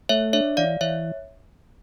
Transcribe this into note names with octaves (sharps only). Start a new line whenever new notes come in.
A3 C#5 E5
D4 C#5 E5
E3 D5 F5
E3 C#5 E5